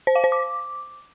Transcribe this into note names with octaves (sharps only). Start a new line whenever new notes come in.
C5
F5
C5
D6